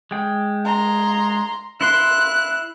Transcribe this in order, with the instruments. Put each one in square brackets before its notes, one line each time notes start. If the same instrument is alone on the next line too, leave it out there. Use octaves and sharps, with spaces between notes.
[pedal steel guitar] G#3 G5
[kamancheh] A#5 C6
[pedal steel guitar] E4 C6 [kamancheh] F#6